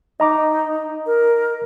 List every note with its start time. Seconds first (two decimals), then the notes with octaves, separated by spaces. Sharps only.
0.20 D#4 D#5 A#5 D6
1.06 A#4